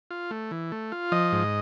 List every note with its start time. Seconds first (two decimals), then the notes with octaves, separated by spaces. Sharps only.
0.11 F4
0.31 A3
0.51 E3
0.72 A3
0.92 F4
1.12 F3 D#5
1.32 G#2